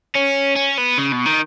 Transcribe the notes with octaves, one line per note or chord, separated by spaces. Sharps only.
C#4
C#4
B3
C#3
B2
D#3